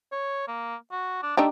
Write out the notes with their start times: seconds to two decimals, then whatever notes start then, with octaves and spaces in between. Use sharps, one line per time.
0.12 C#5
0.48 A#3
0.92 F#4
1.23 D4
1.37 A3 D4 D#4 G4